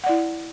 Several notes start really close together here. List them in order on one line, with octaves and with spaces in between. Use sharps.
F#5 D5 E4